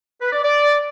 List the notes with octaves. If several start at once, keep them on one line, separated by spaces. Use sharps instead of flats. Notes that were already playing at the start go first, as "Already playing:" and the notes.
B4
D5
D5